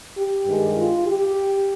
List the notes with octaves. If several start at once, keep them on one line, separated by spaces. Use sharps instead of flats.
G4
G2 D#3 G#3
F4
G4